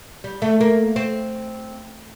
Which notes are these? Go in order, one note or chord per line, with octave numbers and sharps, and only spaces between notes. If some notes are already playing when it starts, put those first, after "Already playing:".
G3
A3
A#3
C4